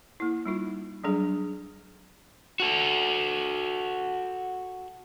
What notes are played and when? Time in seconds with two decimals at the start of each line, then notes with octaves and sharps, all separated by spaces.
0.20 A#3 E4
0.46 G3 D#4 F4
1.04 F#3 G3 D4 G#4
2.60 F#4 A4